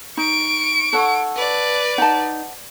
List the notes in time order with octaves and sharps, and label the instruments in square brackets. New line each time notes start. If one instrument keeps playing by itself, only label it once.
[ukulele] D#4 [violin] C#6 D7
[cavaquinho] A4 C#5 F#5
[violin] B4 D5
[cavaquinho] D#4 [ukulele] F#5 A5